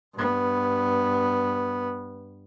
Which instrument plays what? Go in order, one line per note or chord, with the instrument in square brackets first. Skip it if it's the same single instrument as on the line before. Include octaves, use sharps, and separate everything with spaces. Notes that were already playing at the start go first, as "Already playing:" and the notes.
[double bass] G2 B3